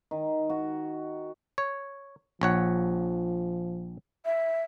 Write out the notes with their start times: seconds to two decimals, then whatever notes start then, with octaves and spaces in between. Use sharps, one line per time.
0.11 D#3
0.50 F#4
1.58 C#5
2.41 A#1 F3 C#5 F#5
4.25 E5